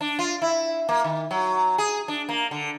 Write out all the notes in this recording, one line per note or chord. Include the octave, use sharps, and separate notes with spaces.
D4
F4
E4
A#3
D#3
F#3
G#4
D4
A#3
D3